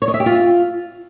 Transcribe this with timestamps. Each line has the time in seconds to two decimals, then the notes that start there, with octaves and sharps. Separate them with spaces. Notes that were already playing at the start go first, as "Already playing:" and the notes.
0.02 C#5
0.08 D#5
0.14 E5
0.20 G4
0.26 F4